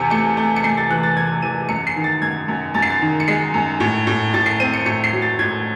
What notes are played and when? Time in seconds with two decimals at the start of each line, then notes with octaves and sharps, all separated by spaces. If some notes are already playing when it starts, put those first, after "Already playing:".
Already playing: E2 C3 C#7
0.10 A3 C#7
0.37 A3
0.56 C#7
0.63 A3 C7
0.77 A6
0.90 E3 F#6
1.03 A6
1.17 E2 G#6
1.42 E3 D#7
1.69 F#2 C#7
1.87 C7
1.96 D#3
2.04 A6
2.21 F#2 G#6
2.48 F#2
2.74 F#2 A6
2.82 C7
2.90 A6
3.02 D#3
3.20 C#7
3.28 G#3 C7
3.54 F#2
3.80 A2
4.07 A2
4.34 A2 A6
4.46 C7
4.60 C4 D#7
4.73 C#7
4.86 A2 C#7
5.04 C7
5.13 F#3
5.22 A6
5.39 A2 G#6